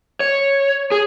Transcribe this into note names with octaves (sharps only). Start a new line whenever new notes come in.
C#5
G#4